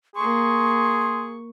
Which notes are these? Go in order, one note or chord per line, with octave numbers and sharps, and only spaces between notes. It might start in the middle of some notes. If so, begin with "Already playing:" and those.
A#3 G#4 C6 C#6